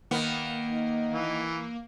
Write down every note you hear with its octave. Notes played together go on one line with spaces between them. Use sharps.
D#3 A#3 B3
D#4
E3